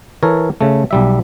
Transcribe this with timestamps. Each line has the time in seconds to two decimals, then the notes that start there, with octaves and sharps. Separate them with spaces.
0.23 E3 A4 A#4 C#5
0.61 C#3 A3
0.91 B1 G3 E5